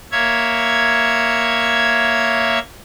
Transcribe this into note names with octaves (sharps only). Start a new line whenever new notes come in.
A#3 C#5 E5 G#6